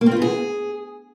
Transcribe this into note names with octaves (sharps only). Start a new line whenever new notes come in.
A#3
C4
F4
B3
G#4